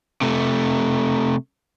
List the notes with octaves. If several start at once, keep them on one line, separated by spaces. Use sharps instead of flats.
C3 A3